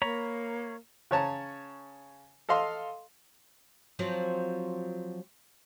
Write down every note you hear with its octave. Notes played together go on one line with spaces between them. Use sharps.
A#3 C#5 A#5 B5
C#3 C#5 A5 A#5
A4 D#5 F5 C6
F3 F#3 C4